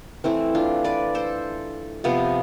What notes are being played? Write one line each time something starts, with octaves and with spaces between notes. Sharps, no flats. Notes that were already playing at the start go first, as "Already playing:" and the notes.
E3 A3 C4 E4
D4 F4
B4 D5
A4 C5
C3 F3 B3